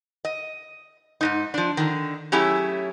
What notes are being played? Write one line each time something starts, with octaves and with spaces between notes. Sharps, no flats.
D#5
G#2 C3 D#4
F3 D4
D3 D#3
F#3 A3 C#4 E4 G4 G#4